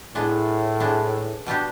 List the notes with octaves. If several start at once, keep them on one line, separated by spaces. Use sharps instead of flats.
A2 G#3 B3 D4
G#3 B3 D4
B2 G3 B3 D4 G4